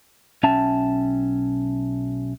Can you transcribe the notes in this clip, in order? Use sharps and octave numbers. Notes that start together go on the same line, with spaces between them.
B1 C#4 E5 G5 A5